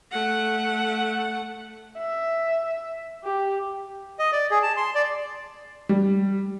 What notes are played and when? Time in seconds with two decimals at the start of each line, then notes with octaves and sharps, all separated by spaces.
0.12 A3 F#5
1.98 E5
3.24 G4
4.19 D#5
4.32 D5
4.51 G#4
4.63 A5
4.77 C6
4.95 D5
5.89 G3